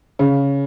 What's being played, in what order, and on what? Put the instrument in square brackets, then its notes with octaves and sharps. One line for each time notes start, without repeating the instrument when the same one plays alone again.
[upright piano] C#3